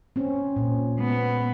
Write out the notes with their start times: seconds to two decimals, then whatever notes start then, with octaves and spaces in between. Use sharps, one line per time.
0.16 C4 C#4
0.56 A#2
0.98 G#3 B3